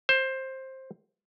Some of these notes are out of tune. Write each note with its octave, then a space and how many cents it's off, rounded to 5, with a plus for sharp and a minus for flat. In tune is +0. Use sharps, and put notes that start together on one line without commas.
C5 +15